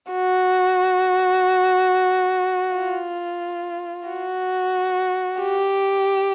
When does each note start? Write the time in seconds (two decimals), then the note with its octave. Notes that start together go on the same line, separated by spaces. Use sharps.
0.12 F#4
2.76 F4
4.08 F#4
5.39 G4